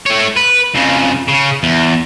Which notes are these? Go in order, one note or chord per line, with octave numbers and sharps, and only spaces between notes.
A3 C#5
B4
F2 C#3
C#3
E2